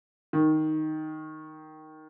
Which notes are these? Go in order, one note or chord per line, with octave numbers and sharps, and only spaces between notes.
D#3